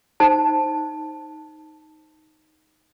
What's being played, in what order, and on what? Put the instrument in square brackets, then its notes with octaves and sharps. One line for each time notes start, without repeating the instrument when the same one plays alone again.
[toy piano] D#4 C5 A5